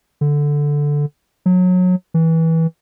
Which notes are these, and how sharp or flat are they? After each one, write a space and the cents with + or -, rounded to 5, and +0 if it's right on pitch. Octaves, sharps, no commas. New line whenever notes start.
D3 -5
F#3 -25
E3 -20